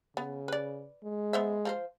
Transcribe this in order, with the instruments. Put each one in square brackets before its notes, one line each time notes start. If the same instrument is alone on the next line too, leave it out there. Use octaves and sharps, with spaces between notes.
[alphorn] C#3 [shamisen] B3
[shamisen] B4 D5
[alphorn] G#3
[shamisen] B3 C5 E5
F3 A4 C5